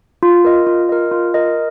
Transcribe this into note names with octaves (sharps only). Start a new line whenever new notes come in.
F4
A#4 D#5
F4
A#4 D#5
F4
A#4 D#5